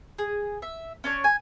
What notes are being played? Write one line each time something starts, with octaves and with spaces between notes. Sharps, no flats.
G#4
E5
C#4 D4 C#5
G#5